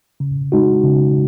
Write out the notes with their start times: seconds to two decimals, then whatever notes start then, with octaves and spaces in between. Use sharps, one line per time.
0.20 C#3
0.52 G#3 D#4 F#4
0.84 C#3